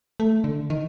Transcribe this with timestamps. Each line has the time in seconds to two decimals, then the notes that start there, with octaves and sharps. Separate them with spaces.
0.20 A3
0.44 D3
0.70 D#3